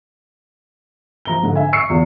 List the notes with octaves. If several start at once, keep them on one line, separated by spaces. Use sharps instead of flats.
F3 A#5 G7
G#2 D3
E5 G#5
C#6 E6 C7 C#7
E2 F4